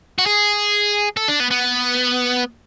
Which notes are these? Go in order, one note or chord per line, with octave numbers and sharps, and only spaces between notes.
F#4
G#4
A4
D4
B3
B3